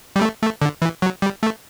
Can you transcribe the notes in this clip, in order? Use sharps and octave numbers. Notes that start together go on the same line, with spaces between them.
G3
A3
A3
D3
E3
F#3
G3
A3